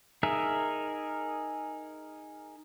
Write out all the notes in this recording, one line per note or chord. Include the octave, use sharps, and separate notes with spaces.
D#4 G#4 A#4 E5